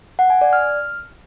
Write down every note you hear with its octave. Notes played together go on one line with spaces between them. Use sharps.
F#5
G#5
D5
F6